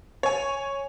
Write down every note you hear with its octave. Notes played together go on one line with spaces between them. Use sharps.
C#5 G#5